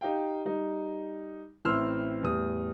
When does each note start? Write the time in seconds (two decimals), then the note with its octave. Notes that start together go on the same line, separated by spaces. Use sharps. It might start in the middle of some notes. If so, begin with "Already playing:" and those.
0.01 D#4 G4 F5 G5
0.45 G3 D#4
1.65 A1 C4 E4 C6 E6 F6
2.23 E2 A2 G3 D#6